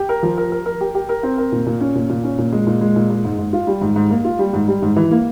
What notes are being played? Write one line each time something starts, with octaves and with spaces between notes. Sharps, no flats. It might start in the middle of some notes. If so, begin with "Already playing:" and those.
Already playing: G4
A#4
F3
A#4
A#4
A#4
G4
G4
A#4
C4
A#4
A#2
A#2
C#4
A#2
A#2
C#4
A#2
G#3
A#2
G#3
A#2
G#3
G#2
G#2
F4
G3
G#2
G#2
A#3
F4
G3
G#2
G3
G#2
E3
A#3